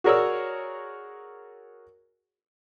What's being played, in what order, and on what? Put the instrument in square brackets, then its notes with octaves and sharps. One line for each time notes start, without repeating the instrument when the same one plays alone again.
[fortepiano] F#4 G#4 A#4 C#5 D5 E6